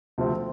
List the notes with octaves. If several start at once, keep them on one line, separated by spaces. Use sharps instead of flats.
D2 C3 F3 C4